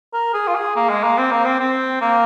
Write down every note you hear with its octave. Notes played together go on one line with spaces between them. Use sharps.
A#4
G#4
F4
G#4
A#3
G#3
A#3
C4
A#3
C4
C4
A#3